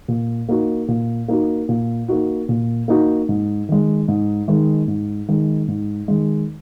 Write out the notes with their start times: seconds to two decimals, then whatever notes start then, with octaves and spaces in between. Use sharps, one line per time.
0.08 A#2
0.49 A#3 D#4 F#4
0.88 A#2
1.28 A#3 D#4 F#4
1.69 A#2
2.08 A#3 D#4 F#4
2.49 A#2
2.88 A#3 D#4 F#4
3.29 G#2
3.69 D#3 G#3
4.08 G#2
4.48 D#3 G#3
4.88 G#2
5.28 D#3 G#3
5.68 G#2
6.08 D#3 G#3